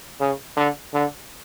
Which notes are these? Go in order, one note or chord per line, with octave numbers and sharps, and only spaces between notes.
C#3
D3
D3